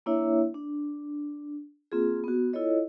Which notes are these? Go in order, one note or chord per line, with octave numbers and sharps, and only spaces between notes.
A#3 D4 E4 C#5 E5
D4
A#3 C4 F4 G#4
B3 F#4
E4 F4 A4 C#5 D#5